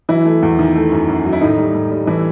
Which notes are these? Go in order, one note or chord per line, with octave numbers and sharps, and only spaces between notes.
E3 F#3 E4
A3
E2
D#3
A3
F#2
F#2
F#3
E4
A2 D#3 D#4
G3
A2
G3
E3 A3 E4